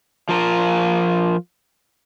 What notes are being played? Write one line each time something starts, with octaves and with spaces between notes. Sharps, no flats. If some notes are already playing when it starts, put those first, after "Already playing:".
F3 F4 A#4